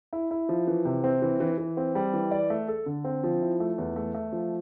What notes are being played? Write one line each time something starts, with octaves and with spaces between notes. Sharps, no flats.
E4
E4
F3
E3
C3
C4
E3
E3
E3
C4
G3
E3
D5
A3
A4
D3
C4
F3
E4
A3
E2
A3
A3
F3